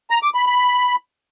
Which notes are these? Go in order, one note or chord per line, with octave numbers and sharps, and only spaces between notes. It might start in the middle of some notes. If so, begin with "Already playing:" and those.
A#5
D6
B5
B5